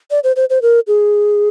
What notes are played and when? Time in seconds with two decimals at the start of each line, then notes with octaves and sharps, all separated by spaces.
0.11 D5
0.24 C5
0.36 C5
0.50 C5
0.62 A#4
0.87 G#4